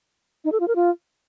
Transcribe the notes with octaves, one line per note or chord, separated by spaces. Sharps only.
D#4
A4
F4
A#4
F4